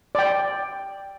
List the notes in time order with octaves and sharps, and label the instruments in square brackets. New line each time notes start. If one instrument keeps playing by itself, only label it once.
[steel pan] D5 G5